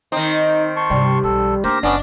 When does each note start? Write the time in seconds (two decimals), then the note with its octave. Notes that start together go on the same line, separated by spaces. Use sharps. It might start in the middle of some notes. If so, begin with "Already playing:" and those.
0.12 D#3 C4 D#4
0.76 A5 C6 C#6
0.90 G2 C3 G3
1.23 B1 F3 A4
1.64 A#3 D4 G4 A#4 C5 A#6
1.83 F#1 B3 C#4 D4